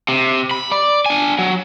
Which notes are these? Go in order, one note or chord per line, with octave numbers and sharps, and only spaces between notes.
C3
B5
D5
D4 G#5
F#3